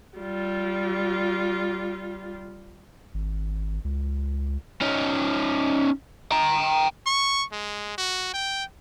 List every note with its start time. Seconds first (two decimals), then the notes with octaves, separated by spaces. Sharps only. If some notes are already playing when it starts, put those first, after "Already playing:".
0.18 G3 F4
3.14 G#1
3.85 C#2
4.82 C#4 D#4
6.32 G5 A#5
7.06 C#6
7.52 G#3
7.98 F#4
8.34 G5